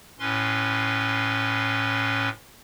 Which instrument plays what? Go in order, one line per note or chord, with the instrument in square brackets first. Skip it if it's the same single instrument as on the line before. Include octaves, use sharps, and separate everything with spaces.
[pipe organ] A2 C#4 B4 C6